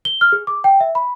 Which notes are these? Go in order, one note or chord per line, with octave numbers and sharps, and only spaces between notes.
G7
F6
G#4
D6
G5
E5
B5